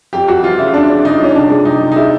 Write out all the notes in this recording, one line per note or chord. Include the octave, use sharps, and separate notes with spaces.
F2 G4
F2 F#4
E3 F4
C#3 E4
F2 D4
C#3
C#3 D#4
F2 C#4
C3 D4
G#3
C3 D#4
C3
D#4
G#3 E4